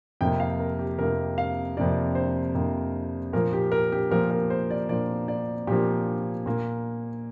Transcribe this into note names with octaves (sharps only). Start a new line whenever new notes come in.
F2 C3 A#3 G5
F5
A#4
G4
F2 C3 A#3 A#4
F5
F2 C3 A#3 D5
C5
F2 C3 A#3
A#2 F3 A#3 A#4
G4
A#4
G4
A#2 F3 A#3 A#4
A#4
C5
D5
A#2 F3 A#3 D5
D5
A#2 F3 A#3 G4
A#2 A#3